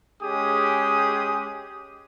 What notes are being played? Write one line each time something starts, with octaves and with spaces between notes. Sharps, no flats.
G#3 C#4 G4 G#4 D#6